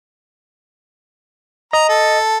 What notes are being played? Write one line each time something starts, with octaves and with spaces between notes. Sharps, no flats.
D#5 A#5
A4